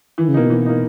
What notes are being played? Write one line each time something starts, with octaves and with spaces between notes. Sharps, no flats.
D#3 E3
C#3
B2 A#3 D#4
E3
A#3 D#4